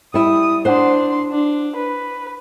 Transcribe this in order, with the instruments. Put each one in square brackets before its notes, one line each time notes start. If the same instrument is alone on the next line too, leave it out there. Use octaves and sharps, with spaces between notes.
[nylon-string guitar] G3 E4 [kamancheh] D#6
[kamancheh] D4 C6 [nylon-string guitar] C5 F#5
[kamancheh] D4
B4